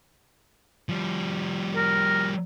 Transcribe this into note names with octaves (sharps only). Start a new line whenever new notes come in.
F3 G3
A#4